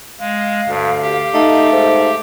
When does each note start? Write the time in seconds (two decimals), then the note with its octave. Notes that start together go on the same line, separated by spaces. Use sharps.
0.20 G#3 F5
0.67 D2 G2
1.01 G4
1.34 A3 D#4
1.72 G#2